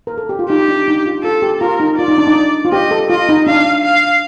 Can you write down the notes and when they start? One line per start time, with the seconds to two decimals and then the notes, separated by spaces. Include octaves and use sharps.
0.07 A#4
0.18 A4
0.29 G4
0.39 F4
0.50 D#4 G4
0.69 D4
0.88 D#4
1.06 F4
1.24 F4 A4
1.42 G4
1.61 F4 A#4
1.80 D#4
1.98 F4 D5
2.08 D#4
2.18 D4
2.27 D#4
2.65 F4
2.72 G4 D#5
2.91 A4
3.10 F4 D#5
3.29 D#4
3.47 D4 F5
3.84 F5